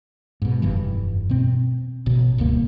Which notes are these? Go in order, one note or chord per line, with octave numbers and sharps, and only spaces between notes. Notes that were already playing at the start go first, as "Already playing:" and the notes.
G#2 B2
F1 G2 E3
B2 C4
A1 B2
D1 C#2 G2 A#3